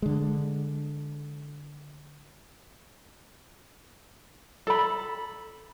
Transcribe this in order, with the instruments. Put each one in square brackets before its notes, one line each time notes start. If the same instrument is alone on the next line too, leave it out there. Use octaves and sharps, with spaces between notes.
[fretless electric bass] D3 G#3
[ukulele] A4 B5